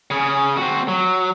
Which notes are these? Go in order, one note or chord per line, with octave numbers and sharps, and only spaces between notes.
C#3 G#4
C4 F#4
F#3